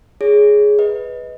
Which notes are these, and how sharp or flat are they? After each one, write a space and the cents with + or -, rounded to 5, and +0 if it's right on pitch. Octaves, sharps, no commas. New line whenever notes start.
G#4 +0 C#5 +25
B4 +0 D#5 +15